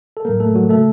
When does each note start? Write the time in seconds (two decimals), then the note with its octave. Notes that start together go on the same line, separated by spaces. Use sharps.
0.17 A4
0.25 A2 F#3 A#3 A#4
0.40 A3 A4
0.55 F#3 F#4
0.69 C#3 A3 A4